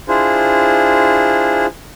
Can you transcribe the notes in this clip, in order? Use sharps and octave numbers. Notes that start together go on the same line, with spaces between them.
D4 E4 F4 G#4 C5